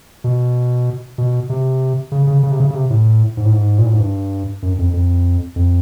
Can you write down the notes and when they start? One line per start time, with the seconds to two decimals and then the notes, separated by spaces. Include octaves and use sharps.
0.24 B2
1.18 B2
1.49 C3
2.12 C#3
2.27 C#3
2.43 C#3
2.52 C3
2.60 C#3
2.70 C#3
2.75 C3
2.90 A2
3.37 G#2
3.45 A2
3.53 G#2
3.78 A#2
3.86 A2
3.93 G#2
3.99 G2
4.62 F#2
4.78 F2
4.93 F2
5.56 F2